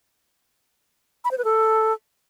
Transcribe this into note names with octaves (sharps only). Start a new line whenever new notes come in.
B5
C5
B4
A4